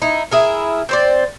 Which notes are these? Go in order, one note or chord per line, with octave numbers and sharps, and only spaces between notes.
D#4 E4
E4 G#4 A#4
C4 C5 D5